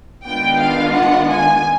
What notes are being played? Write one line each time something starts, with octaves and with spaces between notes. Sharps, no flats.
D#3 G#3 B3 D4 F4 G5
F5
F#5
G#5